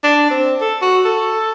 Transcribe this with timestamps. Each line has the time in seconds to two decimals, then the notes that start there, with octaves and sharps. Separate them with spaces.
0.03 D4
0.31 C4
0.61 A4
0.82 F#4
1.05 A4